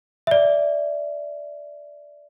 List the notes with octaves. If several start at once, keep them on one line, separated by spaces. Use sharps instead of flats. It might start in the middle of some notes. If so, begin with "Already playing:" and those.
D5 E5